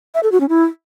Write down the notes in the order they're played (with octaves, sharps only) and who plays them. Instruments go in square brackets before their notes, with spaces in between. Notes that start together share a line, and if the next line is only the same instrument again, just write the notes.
[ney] E5
A4
F#4
C#4
E4